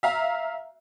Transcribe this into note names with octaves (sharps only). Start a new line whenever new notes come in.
E5 F5 A#5